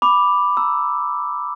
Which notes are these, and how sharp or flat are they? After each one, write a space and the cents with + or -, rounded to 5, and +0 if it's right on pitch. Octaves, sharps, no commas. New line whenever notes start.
B5 +0 D6 +0
A#5 +0 E6 +0